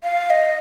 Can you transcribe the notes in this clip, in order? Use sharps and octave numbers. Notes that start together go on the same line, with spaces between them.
F5
D#5